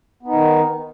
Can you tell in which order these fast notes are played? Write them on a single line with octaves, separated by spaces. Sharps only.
B3 D#4 D#3